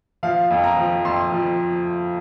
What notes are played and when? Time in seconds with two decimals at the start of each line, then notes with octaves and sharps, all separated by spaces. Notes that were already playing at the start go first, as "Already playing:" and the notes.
0.23 F3 F5
0.50 F2
0.64 A#5
0.77 F3
1.05 F2 C6
1.32 F3